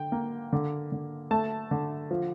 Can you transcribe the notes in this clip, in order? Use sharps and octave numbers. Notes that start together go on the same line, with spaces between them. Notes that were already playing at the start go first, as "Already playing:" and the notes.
Already playing: D3 G5
A#3
D3
D3
A3 A5
D3
F3